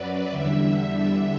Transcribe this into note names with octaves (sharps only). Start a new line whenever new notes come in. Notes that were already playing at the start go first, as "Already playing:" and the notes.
Already playing: F#2 F#3 B4 D5
E2 D3 G3 E5